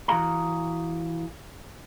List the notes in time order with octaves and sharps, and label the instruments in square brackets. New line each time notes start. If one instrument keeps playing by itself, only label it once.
[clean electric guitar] E3 F#4 G#4 F5 A#5